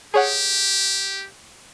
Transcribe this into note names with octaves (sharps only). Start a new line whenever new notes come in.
G4 G#4 C#5 F#5